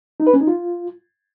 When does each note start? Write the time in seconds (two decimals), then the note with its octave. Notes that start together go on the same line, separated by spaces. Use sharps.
0.20 D#4
0.27 B4
0.34 C#4
0.40 D#4
0.47 F4